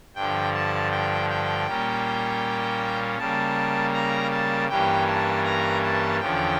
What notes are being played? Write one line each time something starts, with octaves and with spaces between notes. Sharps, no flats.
G2 D3 F3 G5
A5
G5
G5
A#2 G3 A#3 C#4
C#3 G3 A#3 A5
A#5
A5
G2 E3 G3 A#3 C#4 G5
A5
A#5
A5
E2 D3 F3 C#4 G5